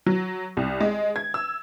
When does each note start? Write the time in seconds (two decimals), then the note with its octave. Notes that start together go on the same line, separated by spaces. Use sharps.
0.06 F#3
0.57 C2
0.81 G#3
1.16 G#6
1.34 E6